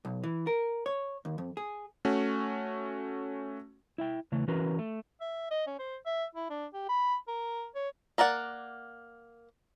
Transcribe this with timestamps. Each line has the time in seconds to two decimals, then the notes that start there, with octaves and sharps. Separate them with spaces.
0.05 B1
0.24 E3
0.47 A#4
0.86 C#5
1.25 D#2
1.38 F2
1.57 G#4
2.05 A3 C#4 F#4
3.98 E4 E5 G5
4.32 C#3 E3 A3
4.48 E3 C#4 F#4 A#4 B4
4.79 A3
5.21 E5
5.51 D#5
5.67 C#4
5.79 C5
6.06 E5
6.35 E4
6.50 D4
6.74 G4
6.89 B5
7.28 A#4
7.75 C#5
8.18 A#3 A#4 D5 F#5